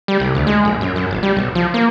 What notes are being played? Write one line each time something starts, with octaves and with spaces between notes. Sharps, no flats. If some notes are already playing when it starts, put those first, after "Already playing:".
G3
C2
D2
G#3
A#1
F#2
F#2
G#1
G3
B1
F3
A#3